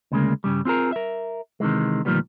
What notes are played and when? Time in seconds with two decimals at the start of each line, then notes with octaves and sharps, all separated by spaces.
0.12 D2 C#3 G#3 A#3
0.44 G2 C#3 G3
0.65 C4 F4 G#4 A#4
0.92 A#4 E5
1.60 C3 D#3 E3 G#3
2.05 D2 A#2 D#3 F3 G3 B3